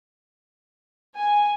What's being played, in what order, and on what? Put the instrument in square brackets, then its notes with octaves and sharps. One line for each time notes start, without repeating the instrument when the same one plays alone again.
[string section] G#5